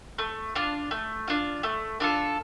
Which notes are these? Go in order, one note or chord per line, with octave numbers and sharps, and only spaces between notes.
A3
D4 F4
A3
D4 F4
A3
D4 F4 A4